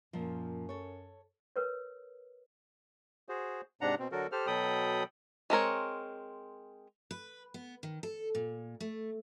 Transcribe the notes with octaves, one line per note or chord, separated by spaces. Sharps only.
F#2 A#2 F3
A4 C#5
A#4 B4 C#5
F#4 G#4 C5
G#2 C3 D4 F#5 A#5
B2 C4
D3 F#3 F#4 A4 A#4
G4 A4 C5 F6
B2 F#3 A4 G5 B5 D#6
G#3 C4 A#4 C#5
B4
B3
D#3
A4
A#2
A3